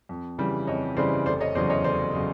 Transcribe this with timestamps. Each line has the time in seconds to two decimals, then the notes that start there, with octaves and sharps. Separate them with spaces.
0.09 F2
0.38 C#3 E3 G3
0.67 F2 C#5 D#5
0.97 C#3 E3 G3 C5 D5
1.26 F1 C5 D5
1.40 C#5 D#5
1.55 E2 C#3 F#3 C5 D5
1.70 C#5 D#5
1.84 F1 C5 D5
2.15 C#3 F#3